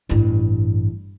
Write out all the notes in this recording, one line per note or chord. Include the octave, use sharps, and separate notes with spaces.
A1 G2